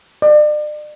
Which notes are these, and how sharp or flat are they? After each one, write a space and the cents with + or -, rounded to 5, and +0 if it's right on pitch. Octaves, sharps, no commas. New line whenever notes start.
D5 +40